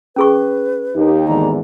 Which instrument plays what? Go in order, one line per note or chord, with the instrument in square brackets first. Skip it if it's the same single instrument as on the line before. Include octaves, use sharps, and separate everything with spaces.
[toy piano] C#4 G#4 C#6 [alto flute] B4
[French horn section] D#2 D#4 [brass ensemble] G4
[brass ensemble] G#1 E2 D3 [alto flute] A#5